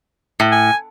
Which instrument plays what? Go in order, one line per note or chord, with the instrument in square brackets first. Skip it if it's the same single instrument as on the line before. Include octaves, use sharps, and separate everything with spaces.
[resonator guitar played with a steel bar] A2
[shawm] G#5